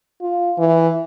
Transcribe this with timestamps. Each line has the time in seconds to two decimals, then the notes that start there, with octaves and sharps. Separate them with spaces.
0.21 F4
0.58 E3